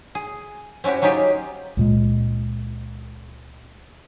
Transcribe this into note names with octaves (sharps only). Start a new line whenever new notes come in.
G#4
C4 C#4 E4 F#4 G4
F#3 C#4 D#4 F4 G4 G#4
C#2 A#2 G#3